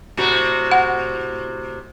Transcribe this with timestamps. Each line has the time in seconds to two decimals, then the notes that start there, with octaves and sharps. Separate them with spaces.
0.17 A2 C3 F#4
0.71 F#5